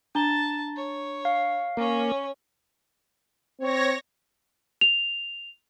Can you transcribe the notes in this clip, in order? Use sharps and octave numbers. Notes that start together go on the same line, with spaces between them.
D4 A5 A#5 G7
C#5
F5
A#3 C#4 C#5
C4 C#5 A#6
F7